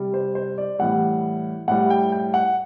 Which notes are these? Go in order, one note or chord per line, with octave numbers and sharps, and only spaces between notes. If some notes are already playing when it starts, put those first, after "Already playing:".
Already playing: C3 G3
C5
C5
D5
A2 E3 G3 F#5
A2 G3 F#5
G5
G5
F#5